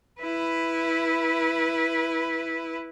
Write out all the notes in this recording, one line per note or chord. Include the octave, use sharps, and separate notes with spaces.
E4 B4